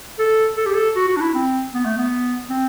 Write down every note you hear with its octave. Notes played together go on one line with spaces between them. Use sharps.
A4
A4
G4
A4
F#4
F#4
D4
E4
C4
B3
A3
B3
C4